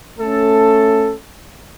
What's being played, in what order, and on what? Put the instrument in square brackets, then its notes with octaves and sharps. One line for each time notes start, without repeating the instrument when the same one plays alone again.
[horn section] A3 C#4 A4